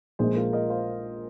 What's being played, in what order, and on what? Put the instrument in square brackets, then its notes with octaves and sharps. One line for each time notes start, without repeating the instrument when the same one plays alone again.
[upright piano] A#1 A#2 G#3 [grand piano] G#4 C5
[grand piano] F4 A#4
A#4 D#5
C5 F5